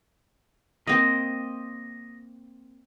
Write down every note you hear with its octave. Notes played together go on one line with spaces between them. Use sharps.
A#3 C4 D#5